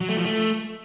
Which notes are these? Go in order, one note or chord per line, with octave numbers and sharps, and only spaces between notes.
F#3
A3
F3
A3